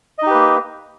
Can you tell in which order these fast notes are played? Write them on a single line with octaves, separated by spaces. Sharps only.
D#5 D#4 G4 B4 A#3